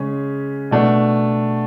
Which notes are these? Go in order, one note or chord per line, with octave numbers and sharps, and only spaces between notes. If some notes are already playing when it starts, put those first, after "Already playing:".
Already playing: C#3 G#3 C#4 G#4
B2 A3 D4